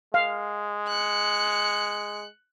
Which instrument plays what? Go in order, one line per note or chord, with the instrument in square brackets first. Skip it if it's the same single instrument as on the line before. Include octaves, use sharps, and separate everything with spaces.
[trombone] G#3 [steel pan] F5
[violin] F#6 C#7